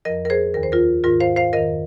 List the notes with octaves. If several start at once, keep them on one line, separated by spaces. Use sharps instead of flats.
F2 F3 A#4 D#5
A#4
G#4 C5
D#2 D#3 A#4
C5
F4 A#4
G#2 D#3 F4 A#4
C5 F5
C5 F5
F2 D#3 A#4 D#5